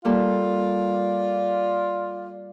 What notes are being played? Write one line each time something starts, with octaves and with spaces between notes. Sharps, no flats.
G3 A#3 F4 A4 D5